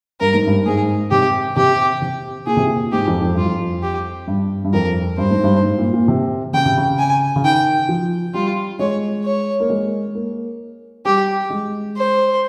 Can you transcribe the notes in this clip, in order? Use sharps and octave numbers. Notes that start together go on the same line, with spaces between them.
G2 A#4
G#2
G2
G#2 G#4
C3 G4
C3 G4
C3
A#2 G#4
C3
A#2
G#2 G4
F2
F2
G2 F4
F2
G4
G2
G2
F2 A#4
G2 C5
G#2
G2
G#2
A#2
A#2
C3
C#3 G5
C3
C#3
G#5
C#3
D#3 G5
F3
G3 F4
G#3 C#5
C#5
A#3
G#3
A#3
G3 G4
G#3
C5